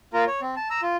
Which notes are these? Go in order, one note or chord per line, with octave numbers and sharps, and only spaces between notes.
A#3 F4 A#4 A#5
C#5
C4
A5
A#5 E6
F4